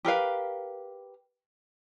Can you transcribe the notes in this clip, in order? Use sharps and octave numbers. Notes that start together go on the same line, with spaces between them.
G4 A#4 B4 F5